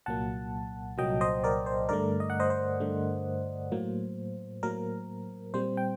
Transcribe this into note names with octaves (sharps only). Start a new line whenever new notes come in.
C2 A#2 F#3 A#3 F#5 A5
C2 A#2 F#3 A#3 D#5 G5
C5 D#5
A#4 D5
C5
G2 D3 A3 A#4 D5
D#5
F#5
C5 D#5
C5
G2 D3 A3
A2 F#3 A#3
A2 F#3 A#3 A#4
A#2 G3 C4 C5
G5